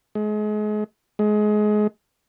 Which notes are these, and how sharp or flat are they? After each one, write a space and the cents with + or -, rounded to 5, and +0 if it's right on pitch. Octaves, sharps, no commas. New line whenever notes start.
G#3 +35
G#3 +25